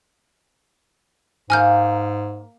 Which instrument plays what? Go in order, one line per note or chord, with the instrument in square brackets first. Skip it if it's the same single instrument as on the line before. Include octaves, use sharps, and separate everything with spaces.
[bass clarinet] G#2 [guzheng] A#3 A#5 [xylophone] G#5 F6 G6